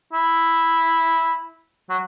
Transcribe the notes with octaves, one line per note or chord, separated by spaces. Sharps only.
E4
F#3